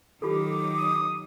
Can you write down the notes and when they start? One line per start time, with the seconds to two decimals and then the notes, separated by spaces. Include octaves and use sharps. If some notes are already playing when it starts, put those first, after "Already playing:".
0.22 D#3 F#3 F4 G4 A4 D6
0.77 D#6